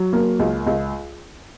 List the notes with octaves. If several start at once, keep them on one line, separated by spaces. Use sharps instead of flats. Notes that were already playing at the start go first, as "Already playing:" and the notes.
Already playing: F#3
A#3
C#2
C#2